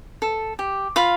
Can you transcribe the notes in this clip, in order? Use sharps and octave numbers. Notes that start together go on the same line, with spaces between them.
A4
G4
F4 F5 B5